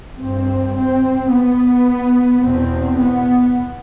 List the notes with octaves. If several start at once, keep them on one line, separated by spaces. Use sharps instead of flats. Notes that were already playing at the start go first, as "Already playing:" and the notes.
G2 C4
C4
B3
E2 B2 C4
B3